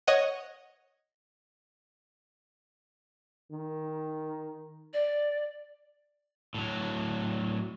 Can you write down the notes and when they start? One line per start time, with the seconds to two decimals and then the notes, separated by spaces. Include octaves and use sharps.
0.07 C#5 D#5 F#5
3.52 D#3
4.93 D5
6.54 A2 F#3